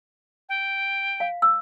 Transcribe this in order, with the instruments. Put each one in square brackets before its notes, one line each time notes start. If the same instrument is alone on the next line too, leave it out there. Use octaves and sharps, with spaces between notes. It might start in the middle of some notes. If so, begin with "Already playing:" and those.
[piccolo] G5
[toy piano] F5
E6